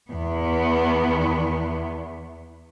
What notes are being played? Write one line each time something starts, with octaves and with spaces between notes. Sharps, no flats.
E2 B3